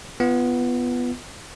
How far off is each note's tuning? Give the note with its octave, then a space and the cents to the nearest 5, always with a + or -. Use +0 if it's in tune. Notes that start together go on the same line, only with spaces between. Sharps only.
B3 +0 F4 -25